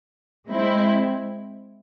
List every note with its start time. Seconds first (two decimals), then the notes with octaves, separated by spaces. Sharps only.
0.48 G#3 C4 E4